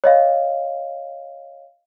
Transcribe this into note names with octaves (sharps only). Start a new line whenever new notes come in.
C#5 D#5 F5